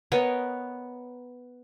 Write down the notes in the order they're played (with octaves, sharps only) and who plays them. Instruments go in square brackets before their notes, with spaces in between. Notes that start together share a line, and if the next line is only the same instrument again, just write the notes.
[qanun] B3 A#4 C#5 D#5